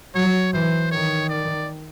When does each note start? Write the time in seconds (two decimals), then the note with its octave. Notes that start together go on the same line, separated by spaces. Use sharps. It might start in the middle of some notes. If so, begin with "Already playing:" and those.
0.15 F#3 C#5
0.54 E3 C5
0.91 D#3 C#5
1.29 D5